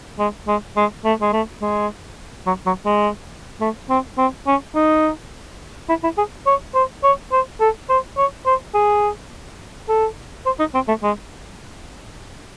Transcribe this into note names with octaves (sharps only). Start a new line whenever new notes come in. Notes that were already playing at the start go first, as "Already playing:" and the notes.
G#3
G#3
G#3
A3
G#3
A3
G#3
F#3
F#3
G#3
A3
C4
C4
C#4
D#4
E4
E4
G#4
C#5
C5
C#5
C5
A4
C5
C#5
C5
G#4
A4
C5
D#4
C4
A3
G#3